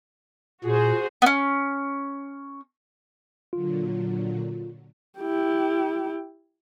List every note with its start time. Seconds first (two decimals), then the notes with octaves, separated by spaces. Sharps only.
0.64 A#2 F#4 G#4 C5
1.22 B3 C#4
3.53 A#2 D3 F#3 F4
5.19 E4 G4